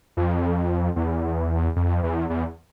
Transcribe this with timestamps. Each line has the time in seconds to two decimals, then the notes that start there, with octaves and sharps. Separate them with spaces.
0.17 F2
0.96 E2
1.76 F2
2.03 E2
2.30 E2